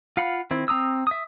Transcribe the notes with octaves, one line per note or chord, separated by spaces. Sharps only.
F4 F5 F#5 B5
D#3 C4 E4
C4 A#5 D#6 E6
E5 D#6